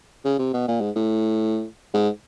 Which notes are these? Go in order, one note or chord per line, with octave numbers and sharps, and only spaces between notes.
C#3
C3
B2
A#2
G#2
A2
G#2